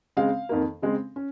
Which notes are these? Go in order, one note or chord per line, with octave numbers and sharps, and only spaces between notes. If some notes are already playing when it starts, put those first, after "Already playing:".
C#3 G#3 C4 F5
F2 D#3 A#3
C#3 G#3 C4
C#4